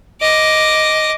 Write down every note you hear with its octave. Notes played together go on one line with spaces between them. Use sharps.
D#5 D6